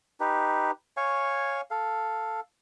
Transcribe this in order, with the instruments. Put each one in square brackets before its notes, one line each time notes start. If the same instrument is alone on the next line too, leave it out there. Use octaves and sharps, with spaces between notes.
[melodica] D#4 G4 B4
C#5 F5 G#5 C#6
A4 F5